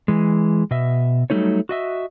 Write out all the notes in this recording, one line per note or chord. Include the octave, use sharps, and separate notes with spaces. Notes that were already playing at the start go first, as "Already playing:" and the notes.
E3 G#3
B2 D#5 E5
F#3 G3 A3 D#4 C#5
F#4 D#5 E5